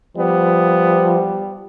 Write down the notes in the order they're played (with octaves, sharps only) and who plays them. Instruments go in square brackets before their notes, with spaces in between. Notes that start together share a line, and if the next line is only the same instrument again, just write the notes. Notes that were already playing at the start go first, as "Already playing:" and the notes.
[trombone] F3 [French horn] G3 [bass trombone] B3